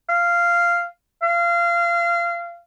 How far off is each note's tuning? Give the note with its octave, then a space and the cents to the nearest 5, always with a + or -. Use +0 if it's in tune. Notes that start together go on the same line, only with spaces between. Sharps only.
F5 -10
F5 -25